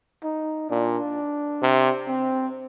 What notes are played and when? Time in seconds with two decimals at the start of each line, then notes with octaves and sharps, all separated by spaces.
0.24 D#4
0.70 A#2 D4
1.62 C3
2.08 C4